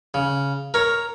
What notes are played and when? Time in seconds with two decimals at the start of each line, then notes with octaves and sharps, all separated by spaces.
0.14 C#3
0.74 A#4 C#5